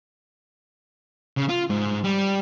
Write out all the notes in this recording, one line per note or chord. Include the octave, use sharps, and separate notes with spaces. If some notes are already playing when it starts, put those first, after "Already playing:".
C#3
F4
G#2
G3